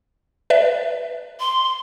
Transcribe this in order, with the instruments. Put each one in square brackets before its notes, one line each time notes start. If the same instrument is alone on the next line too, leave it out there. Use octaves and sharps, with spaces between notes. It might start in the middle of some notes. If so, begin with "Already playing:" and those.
[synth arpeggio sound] B4 D5 E5
[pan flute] C6